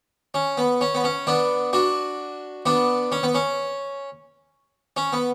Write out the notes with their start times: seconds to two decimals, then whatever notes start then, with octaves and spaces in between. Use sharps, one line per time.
0.34 C#4
0.57 B3
0.81 C#4
0.95 B3
1.04 C#4
1.27 B3 D4
1.73 D4 F#4
2.66 B3 D4
3.12 C#4
3.23 B3
3.35 C#4
4.97 C#4
5.12 B3